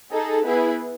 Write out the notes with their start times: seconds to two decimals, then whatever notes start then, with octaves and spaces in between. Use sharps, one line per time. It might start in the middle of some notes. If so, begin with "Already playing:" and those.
0.12 D#4 G#4 A4
0.44 B3 E4 G#4 B4